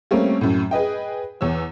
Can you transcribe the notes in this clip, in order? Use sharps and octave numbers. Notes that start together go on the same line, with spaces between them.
G3 A3 A#3 C4 C#4
F#2 A2
G#4 B4 D#5 G5
E2 C#5 E6